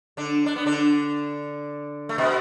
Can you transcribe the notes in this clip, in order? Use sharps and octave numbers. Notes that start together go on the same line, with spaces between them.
D3 D4
D4
B3
D3 D4
A3
B2 B3